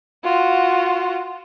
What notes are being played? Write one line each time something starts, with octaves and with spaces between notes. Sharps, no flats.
F4 F#4